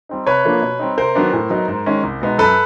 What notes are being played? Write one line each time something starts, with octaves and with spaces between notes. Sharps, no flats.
G3 C4 D#4
C3 B4 C#5
F3 A#3 D4
B2
G3 C4 D#4
C3 A#4 C5
D#3 F#3 B3 D4
A2
F#3 B3 D#4
G#2
D#3 G#3 C#4
C2
B2 G#3 B3 D#4
F#2 A4 B4